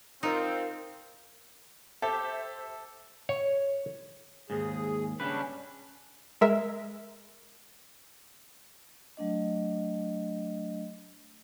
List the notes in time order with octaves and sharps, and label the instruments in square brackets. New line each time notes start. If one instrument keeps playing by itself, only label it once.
[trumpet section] C4 F4 [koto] D#4 [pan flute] A#4
[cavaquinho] G4 [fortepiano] A4 [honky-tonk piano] C5 E5
[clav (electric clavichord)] C#5
[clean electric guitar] D#2 G#2 [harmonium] G#4
[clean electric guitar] C#3 G3 B4 [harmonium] C#4 D4
[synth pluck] G#3 A#4 E5
[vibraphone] F#3 A3 D4 D#5